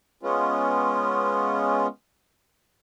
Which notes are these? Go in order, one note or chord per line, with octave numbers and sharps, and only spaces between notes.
G#3 B3 C#4 F4